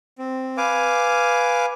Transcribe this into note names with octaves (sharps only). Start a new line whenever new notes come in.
C4
B4 F5 G#5 D6